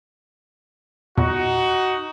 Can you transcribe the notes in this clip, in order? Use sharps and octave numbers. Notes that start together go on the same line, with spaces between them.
E2 A#2 D#4 F#4